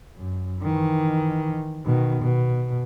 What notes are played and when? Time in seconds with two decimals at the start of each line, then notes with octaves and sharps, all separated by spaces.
0.16 F#2
0.60 D#3 E3
1.85 B2 D#3
2.22 B2